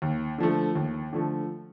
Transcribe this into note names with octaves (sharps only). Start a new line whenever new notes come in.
D#2
D3 F3 A3
D#2
D3 F3 A3